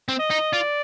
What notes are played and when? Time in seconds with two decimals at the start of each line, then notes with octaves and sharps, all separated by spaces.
0.09 C4
0.19 D#5
0.31 D#4
0.53 F4 D5